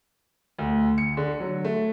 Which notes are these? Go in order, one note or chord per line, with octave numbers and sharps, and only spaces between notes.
D2
C#7
D3
F#3
A3